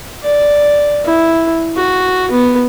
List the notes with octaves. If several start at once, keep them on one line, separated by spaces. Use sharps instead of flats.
D5
E4
F#4
B3